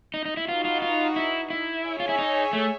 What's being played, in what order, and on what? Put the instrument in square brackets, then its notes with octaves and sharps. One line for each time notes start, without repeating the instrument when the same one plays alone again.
[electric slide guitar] D#4
D#4
E4
[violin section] D#4 F#4 B4 [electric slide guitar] F4
[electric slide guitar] F4
F4
E4
E4
[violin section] G#4 C#5 E5 G#5
[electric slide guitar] F4
E4
D#4
A3